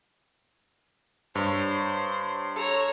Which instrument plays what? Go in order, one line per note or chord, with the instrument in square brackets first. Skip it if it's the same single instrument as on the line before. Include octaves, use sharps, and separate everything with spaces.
[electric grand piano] G2 [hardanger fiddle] C5 [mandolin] C#5
[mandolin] A4 [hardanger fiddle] C#5 A#5